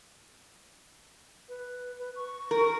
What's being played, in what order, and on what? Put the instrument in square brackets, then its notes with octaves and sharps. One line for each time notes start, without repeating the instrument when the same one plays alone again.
[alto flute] B4
B4
C#6
[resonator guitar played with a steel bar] A#4